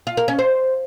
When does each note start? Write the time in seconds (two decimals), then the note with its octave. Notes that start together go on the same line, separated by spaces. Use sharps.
0.07 F4
0.17 A#4
0.28 C#4
0.39 C5